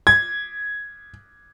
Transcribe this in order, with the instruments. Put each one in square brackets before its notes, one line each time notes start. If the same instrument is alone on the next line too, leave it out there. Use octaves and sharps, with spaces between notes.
[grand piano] G#6